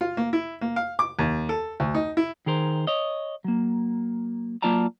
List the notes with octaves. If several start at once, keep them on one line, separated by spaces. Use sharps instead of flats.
F4
A#3
E4
A#3
F5
D6
D#2
A4
D2
D#4
E4
D#3 G#4 A#4 C5
C#5 D#5
F#3 A#3
F#3 A#3 F4 D5 A5 A#5